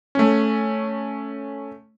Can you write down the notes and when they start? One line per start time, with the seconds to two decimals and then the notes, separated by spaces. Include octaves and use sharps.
0.15 A3 C#4